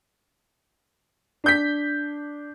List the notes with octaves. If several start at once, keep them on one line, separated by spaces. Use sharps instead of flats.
D4 G6 B6